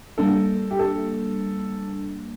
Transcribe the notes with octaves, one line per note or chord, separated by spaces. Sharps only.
G3 A#3 D4 A4
G4
A4